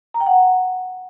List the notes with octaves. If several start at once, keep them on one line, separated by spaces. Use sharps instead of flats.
A#5
G5
F#5